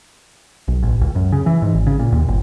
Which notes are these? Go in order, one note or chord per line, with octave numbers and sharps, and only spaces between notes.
B1
A1
C#2
F#2
C#3
E3
G#2
G#1
C#3
A#2
D#2
G1